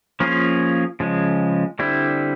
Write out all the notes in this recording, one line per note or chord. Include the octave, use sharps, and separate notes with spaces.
F3 A#3 C#4 F4 G#4
C#3 F3 G#3
D3 G3 C4 E4